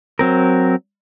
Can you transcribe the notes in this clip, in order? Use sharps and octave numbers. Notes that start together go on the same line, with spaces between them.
F#3 C4 A#4